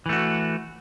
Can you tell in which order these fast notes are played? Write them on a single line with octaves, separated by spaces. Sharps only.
E3 A3 F#4